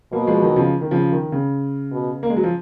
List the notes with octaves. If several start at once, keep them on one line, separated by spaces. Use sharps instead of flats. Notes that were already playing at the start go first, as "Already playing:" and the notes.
B2 F#3 A#3
F3 G#3
D#3 F#3
C#3 F3
D#3
C#3 F3
D#3
C#3
B2
A#3
G#3
F#3
F3